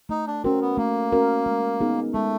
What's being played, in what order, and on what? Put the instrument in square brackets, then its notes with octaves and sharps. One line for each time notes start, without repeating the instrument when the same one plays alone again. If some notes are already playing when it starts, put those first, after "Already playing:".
[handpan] A3 [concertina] D#4
[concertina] D4
[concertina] C4 [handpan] C#4 F#4 A#4
[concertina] B3
[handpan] A3 [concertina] A#3
[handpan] C#4 F#4 A#4
G#3
B3 D#4 G#4
[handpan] G#3 [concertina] A3